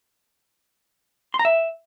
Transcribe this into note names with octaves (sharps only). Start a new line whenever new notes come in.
C6
A#5
E5